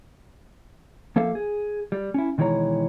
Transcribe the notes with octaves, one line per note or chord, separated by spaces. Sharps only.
F3 A#3 A4 E5 F5
G#4
G3
C#4 E4
B2 D#3 E3 G#3 C#5 A#5